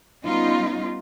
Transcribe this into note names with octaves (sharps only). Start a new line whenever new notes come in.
G3 B3 C#4 D#4 F4